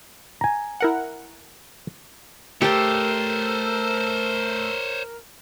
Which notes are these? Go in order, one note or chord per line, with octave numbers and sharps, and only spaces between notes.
G#5 A#5
E4 A#4 F#5
A3 G4 A#4 C5 C#5 A5